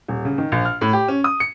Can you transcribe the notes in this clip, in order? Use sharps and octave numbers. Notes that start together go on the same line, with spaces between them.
D#1
C#3
D#3
A#1
F6
A2
G4
C#4
D#6
C#7